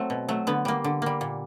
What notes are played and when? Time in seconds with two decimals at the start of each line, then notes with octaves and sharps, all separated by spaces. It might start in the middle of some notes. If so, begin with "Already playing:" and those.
Already playing: F#3 A3 C4
0.10 B2
0.28 F#3 A3
0.47 D3 B3
0.65 G3 A#3
0.84 D3
1.02 G3 A#3
1.21 A#2